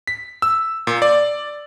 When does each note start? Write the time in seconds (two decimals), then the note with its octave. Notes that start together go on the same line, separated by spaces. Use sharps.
0.07 B6
0.42 E6
0.87 A#2
1.02 D5